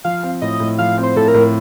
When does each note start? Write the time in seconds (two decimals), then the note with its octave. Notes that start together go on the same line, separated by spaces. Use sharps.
0.04 F3 F5
0.23 C4
0.42 A2 D#5
0.60 A2
0.78 F3 F5
0.98 C4
1.03 C5
1.16 A2 A4
1.28 A#4
1.34 A2